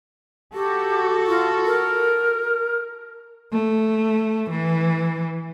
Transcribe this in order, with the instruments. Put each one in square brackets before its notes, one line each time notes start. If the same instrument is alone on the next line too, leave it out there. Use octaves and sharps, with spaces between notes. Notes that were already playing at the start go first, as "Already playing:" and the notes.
[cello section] F#4 A4 [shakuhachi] G4
[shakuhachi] F4
A#4
[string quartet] A3
E3